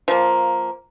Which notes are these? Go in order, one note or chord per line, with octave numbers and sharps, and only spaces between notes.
F3 A#3